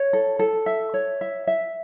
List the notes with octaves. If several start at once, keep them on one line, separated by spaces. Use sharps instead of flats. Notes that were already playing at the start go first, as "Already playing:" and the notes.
Already playing: C#5
A4
A4
E5
C#5
E5
E5